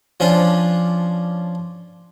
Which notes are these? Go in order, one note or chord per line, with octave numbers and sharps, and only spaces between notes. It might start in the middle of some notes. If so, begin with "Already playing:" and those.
F3 C#4 D4 F4